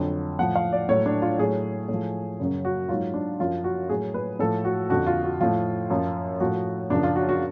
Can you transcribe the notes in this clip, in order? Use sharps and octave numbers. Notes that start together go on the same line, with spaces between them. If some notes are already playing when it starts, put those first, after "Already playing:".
Already playing: F2 D3 F#3
A2 F3 F#5
F5
D5
A2 F#3 C#5
D4
F4
A2 F#3 G#4
A2
F3
F#2 C#3 F#3
F#4
G#2 F#3 F4
D4
F#2 F3 F4
F#4
A2 F#3 G#4
B4
A2 F3 A4
F#4
F2 D3 F3 F#4
F4
F#4
A2 F3 F4
F#2 F3
A2 F3 F#4
F#2 C#3 F3 D4
F4
F#4
F#4